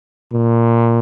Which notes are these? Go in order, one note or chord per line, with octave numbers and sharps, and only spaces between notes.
A#2